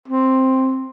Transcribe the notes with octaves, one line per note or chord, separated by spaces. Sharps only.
C4